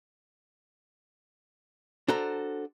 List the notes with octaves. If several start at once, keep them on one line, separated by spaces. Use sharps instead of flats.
D4 F#4 A4 C5 A#5